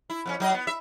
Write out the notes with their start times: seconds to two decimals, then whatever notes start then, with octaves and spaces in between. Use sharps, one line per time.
0.10 E4
0.26 F2 D3 C#4
0.40 F#3 D#5
0.54 B3
0.67 E5